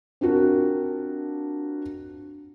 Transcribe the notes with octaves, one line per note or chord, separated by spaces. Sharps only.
C4 D4 F4 F#4 A#4